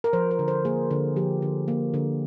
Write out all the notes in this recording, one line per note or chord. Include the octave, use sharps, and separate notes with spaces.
A#4
F3 C5
C5
D3
C5
A#3 G#4
D3
F3 G4
D3
A#3
D3